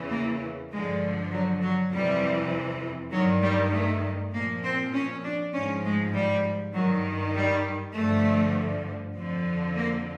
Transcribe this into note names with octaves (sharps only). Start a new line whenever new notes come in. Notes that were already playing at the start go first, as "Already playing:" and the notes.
Already playing: E2 C#3 E3
A#3
G2 D3 F3 G#3
F#3
F#3
F2 C3 E3 G3
G2 D#3 F#3
G3
A3
A#2 F3 A#3
C4
C#4
D4
G#2 F3 C#4
G#3
G3
G2 D#3 F#3
G3
G2 D3 F3 A3
F2 D3 F3
A#3